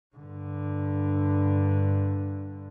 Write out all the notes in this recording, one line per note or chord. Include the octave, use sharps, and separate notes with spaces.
G2 D3